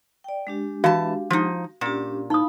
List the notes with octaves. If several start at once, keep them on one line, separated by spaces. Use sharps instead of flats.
D5 G5
G#3 D4 G4
E3 F#4 F5 A5
F3 D#4
A#2 C#4 D4 G4
D#4 E4 F5 B5 D#6